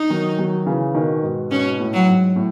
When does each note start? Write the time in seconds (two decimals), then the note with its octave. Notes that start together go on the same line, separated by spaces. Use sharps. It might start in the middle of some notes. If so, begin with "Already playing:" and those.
Already playing: D#4
0.10 D#3 F#3
0.38 D#3 F#3
0.66 C#3 E3
0.94 B2 D#3
1.23 G#2 B2
1.51 G#2 B2 C#4
1.80 A2
1.93 F#3
2.07 G#2
2.36 A2